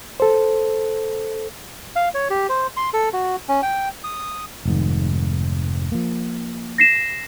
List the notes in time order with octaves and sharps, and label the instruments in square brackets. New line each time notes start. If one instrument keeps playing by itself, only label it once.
[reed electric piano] A4 C5
[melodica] F5
C#5
G4
C5
C6
A4
F#4
C#4
G5
D#6
[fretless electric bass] F1 G#2 D#3
F3 A#3
[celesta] A#6 C7 E7